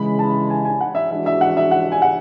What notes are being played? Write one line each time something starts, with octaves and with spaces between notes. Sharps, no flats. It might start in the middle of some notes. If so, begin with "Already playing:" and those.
Already playing: C#3 E3 G#3 B5
A5
G#5
G#5
F#5
E5
E3 G#3 D4 F#4 E5
E5
F#5
E5
F#5
G#5
F#5